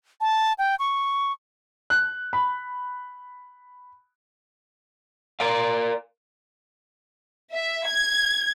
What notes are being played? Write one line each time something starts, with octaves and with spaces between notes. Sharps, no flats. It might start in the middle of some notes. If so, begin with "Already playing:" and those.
A5
G5
C#6
F#6
B5
A#4 D5 F5
E5
G#6